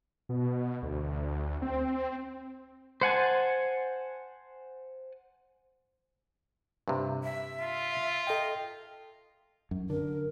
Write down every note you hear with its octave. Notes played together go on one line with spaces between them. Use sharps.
B2
D2
C4
C5 F#5 G#5 A5
G2 C3
E5
F4
A4 D#5 G5
F#2
D3 A#4